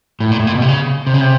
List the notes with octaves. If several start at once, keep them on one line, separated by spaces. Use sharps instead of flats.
A2
A#2
A2
A#2
B2
C3
C#3
C3
C#3
C3